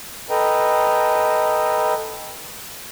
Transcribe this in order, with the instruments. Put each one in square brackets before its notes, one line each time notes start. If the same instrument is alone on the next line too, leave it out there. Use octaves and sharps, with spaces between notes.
[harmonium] A4 B4 D#5 G5 A#5